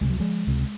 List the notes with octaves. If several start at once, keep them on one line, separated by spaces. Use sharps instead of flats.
C#2 C3 G#3
F#3
F3 G#3
C#2 C3